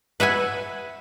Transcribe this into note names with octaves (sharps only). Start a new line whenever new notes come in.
B4 E5 F#5 G#5